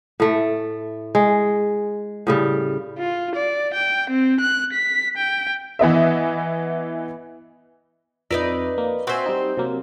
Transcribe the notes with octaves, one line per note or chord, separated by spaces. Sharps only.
A2 A3
G#3
A2 C#3 G3
F4
D5
G5
C4
F#6
B6
G5
E3 B3 D#5 E5
F2 D#4 B4 D5 E5 A#5
A#3
C4 F#4 C5 E5 G#5
G3 D#4
C3 F#3 A#3